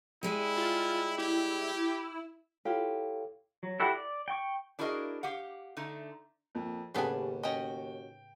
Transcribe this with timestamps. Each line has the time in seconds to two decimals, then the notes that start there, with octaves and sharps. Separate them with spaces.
0.23 G3 G#3 E4 G#4
0.57 F4
1.18 E4 G4
2.65 E4 F4 G4 A4 C#5 F5
3.63 F#3
3.80 E4 F#4 G4 A4 F#5
3.95 D5
4.28 G5 C#6
4.79 D4 E4 F#4 G#4 A#4 D#5
5.23 G4 F5 F#5
5.77 D3 A3 D#4
6.55 F2 A#2
6.94 D#2 A2 C#3 G3 B3 C#4 D4 G#5
7.43 C#4 F#4 D#5 G5